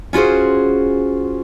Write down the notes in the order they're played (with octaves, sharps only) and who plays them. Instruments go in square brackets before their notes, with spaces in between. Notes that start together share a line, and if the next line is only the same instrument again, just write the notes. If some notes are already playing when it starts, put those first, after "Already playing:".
[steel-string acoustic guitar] C#4 F4 F#4 G#4 C5